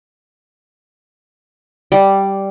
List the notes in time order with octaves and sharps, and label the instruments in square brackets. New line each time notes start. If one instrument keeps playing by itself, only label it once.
[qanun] G3